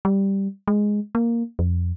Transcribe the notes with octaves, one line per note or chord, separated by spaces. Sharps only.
G3
G#3
A#3
F2